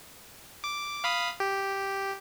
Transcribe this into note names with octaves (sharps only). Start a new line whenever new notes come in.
D6
F5 B5 D#6
G4